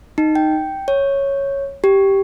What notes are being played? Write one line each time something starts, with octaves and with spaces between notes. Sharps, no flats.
D#4
G5
C#5
G4